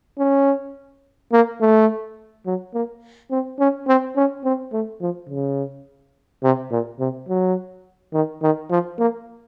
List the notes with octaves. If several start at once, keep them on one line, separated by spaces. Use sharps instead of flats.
C#4
A#3
A3
F#3
A#3
C4
C#4
C4
C#4
C4
A3
F3
C#3
C3
A#2
C3
F#3
D#3
D#3
F3
A#3